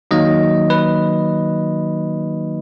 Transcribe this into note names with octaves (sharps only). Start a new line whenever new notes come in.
D#3 F#3 A#3 D#4 D#5
B4